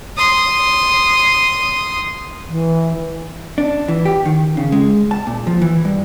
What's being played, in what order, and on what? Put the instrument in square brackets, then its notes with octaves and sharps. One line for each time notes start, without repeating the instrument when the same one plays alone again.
[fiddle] C6 D#6
[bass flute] E3
[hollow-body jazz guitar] D4
E3
G4
D#3
C#3
G#3
A5
A#2
F3
E3
G2